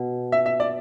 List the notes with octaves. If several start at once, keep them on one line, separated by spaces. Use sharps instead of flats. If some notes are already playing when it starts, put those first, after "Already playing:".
Already playing: B2
E5
E5
D5